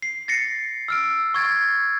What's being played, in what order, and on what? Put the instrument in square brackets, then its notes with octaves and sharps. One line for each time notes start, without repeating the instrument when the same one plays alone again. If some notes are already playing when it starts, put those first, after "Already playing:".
[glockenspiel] C7
A6 A#6 C7 C#7
E6 F6 D7
C#6 G#6 A6 D7